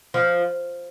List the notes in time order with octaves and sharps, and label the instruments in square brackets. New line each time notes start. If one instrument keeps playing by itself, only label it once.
[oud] F3